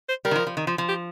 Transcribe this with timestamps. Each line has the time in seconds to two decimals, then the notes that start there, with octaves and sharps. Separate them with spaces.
0.09 C5
0.25 G3 A#4
0.31 D#3
0.36 F3
0.47 F3
0.57 D#3
0.67 F3
0.78 F3
0.88 G4